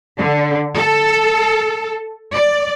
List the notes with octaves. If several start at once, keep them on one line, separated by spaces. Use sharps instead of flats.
D3
A4
D5